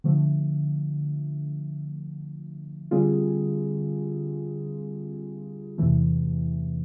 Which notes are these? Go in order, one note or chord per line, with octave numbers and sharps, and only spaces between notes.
D3 F3 A3
D3 G3 C4 F4 G#4
E2 C3 E3 A3